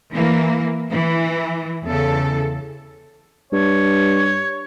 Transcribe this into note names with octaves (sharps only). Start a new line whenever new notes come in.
E3 A#3
E3
E2 C#3 A4
G2 C#5